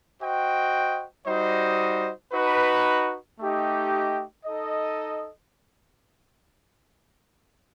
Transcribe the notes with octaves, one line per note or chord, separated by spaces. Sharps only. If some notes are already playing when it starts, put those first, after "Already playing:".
F#4 C5 D#5 G5
G3 D#4 F#4 C5 D#5
D#4 F#4 B4
A3 D#4 G4 D#5
D#4 A4 D#5